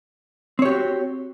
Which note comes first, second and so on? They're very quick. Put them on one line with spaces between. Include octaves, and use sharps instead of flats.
C4 C#5 G4 F#4